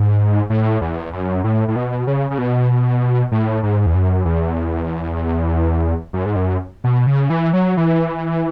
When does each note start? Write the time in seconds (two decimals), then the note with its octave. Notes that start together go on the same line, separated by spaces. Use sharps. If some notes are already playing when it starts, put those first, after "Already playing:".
Already playing: G#2
0.50 A2
0.81 E2
1.13 F#2
1.44 A2
1.68 A2
1.76 B2
2.07 C#3
2.30 C#3
2.38 B2
3.32 A2
3.63 G#2
3.86 E2
3.94 F#2
4.25 E2
6.13 F#2
6.26 G#2
6.36 F#2
6.84 B2
7.07 C#3
7.30 E3
7.53 F#3
7.77 E3